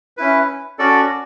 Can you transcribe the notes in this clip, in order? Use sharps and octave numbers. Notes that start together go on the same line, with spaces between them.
C#4 E4 B4
C#4 F#4 A4 D5